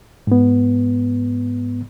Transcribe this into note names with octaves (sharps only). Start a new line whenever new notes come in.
G#2 B3